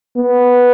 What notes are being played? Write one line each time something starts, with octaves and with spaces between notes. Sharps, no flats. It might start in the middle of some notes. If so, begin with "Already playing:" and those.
B3